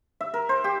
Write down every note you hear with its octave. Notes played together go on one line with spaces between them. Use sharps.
E5
A#4
C5
G4